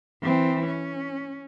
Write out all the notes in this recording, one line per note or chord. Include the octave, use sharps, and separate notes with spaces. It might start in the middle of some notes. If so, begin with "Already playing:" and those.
E3 C4
C#4